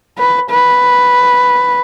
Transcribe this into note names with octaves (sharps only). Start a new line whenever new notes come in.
B4
B4